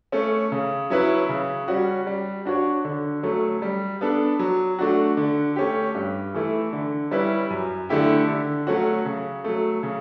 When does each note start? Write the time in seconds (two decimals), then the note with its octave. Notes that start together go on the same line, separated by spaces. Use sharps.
0.12 A3 C#4
0.52 C#3
0.90 F#3 C#4 E4 B4
1.29 C#3
1.68 G3 C#4 F#4
2.07 G3
2.45 D4 F#4 C#5
2.85 D3
3.23 F#3 A3 C#4
3.62 G3
4.01 B3 D4 A4
4.39 F#3
4.79 A3 D4 F#4
5.17 D3
5.56 A3 C#4 G4
5.95 G2
6.34 E3 A3 E4
6.73 D3
7.11 G3 C#4 E4 B4
7.50 F#2
7.89 D3 A3 E4 G4
8.28 D3
8.67 F#3 A3 C#4 F#4
9.05 C#3
9.44 F#3 A3
9.83 C#3